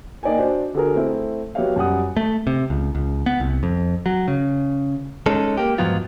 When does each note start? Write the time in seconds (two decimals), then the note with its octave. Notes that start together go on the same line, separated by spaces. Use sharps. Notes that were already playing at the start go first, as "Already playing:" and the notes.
0.23 A#3 D#4 D5 D#5 G5 G#5
0.38 D4 F#4 C5
0.75 D3 F#4 G#4 A#4
0.95 A3 C4 E4
1.55 F#3 B3 G4 C#5 E5 F5
1.76 F#2 G3 F#5 D#6
2.17 A3
2.47 C3
2.70 C#2
2.95 C#2
3.26 B3
3.40 C2
3.63 F2
4.06 F#3
4.28 C#3
5.26 G#3 C#4 D#4 A4
5.57 A#3 G4
5.78 E2 G#2 F3 F#3 B3 F4